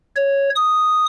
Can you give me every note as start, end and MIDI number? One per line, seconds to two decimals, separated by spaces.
0.16 0.49 73
0.56 1.06 87